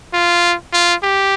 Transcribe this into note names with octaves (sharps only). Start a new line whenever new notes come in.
F4
F4
G4